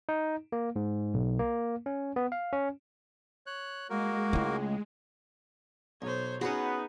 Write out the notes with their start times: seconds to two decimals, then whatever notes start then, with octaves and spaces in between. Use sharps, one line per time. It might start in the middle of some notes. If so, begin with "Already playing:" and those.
0.09 D#4
0.52 A#3
0.76 G#2
1.14 B1
1.39 A#3
1.86 C#4
2.16 B3
2.32 F5
2.53 C#4
3.47 C#5 F#6
3.90 G#3 A#3 F#4 A#4
4.33 C#2 A3 E4
6.02 B1 C5 C#5
6.41 B3 C#4 D#4 F#4 G#4 B4 F#5